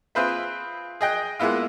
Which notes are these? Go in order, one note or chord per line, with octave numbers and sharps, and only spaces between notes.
C4 F4 G#4 B4 C5 E5
G#4 D#5 G5 F#6
G#3 A#3 B3 E4 F4